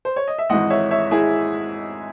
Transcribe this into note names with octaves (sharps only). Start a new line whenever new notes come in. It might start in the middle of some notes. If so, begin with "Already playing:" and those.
C5
C#5
D#5
E5
G#1 G#2 E3 G#3 D#5 F#5
C#5 E5
C#5 E5
E4 G#4